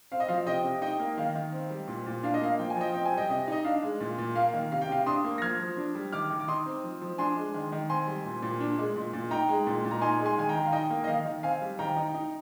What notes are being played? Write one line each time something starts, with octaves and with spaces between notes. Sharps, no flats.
C4 F5
D#5
F3 F5
C3 D#5 G5
C3
D#4 D#5 G5
A#3
D#3 F5
D#3
C4
G3
A#2
A#2
D4 F5
D#5
A#3 F5
F3 G5
G#5
F3 D#5 G5
C4 G5
G#5
G3
D#5 G5
C3 D#5
D#4 D#5
D4 F5
G#3
A#2
A#2
A#3 F5
D#3
C3 F5
G5
C3 F5
D4 C6 D#6
A#3
A#6
F3 F6 G#6
F3
D4
G3
D#3 D6 F6
D#3
D6
D#4 C6 D#6
C4
F3
F3
D4 G#5 C6
G#3
D#3
D#3
C4 G#5 C6
G3
A#2
A#2
D4
G#3
A#2
A#2
D#4 G5 A#5
G#3
A#2
A#2
A#5
D#4 G#5 C6
G#3
G#5 C6
D#3 G#5
G5 A#5
D#3
F5
D#4 D#5 G5
A#3
D#5
D#3 F5
D#3
C4 F5 G#5
G3
D#3 G5 A#5
D#4
D#4